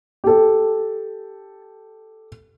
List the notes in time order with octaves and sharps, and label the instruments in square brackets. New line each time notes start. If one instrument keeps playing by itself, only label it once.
[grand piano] G4 A4